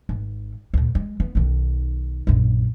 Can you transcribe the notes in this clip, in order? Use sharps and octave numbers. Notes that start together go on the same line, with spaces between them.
G#1
D2 A#2
G#3
B3
B1 D#3
A#1 F#2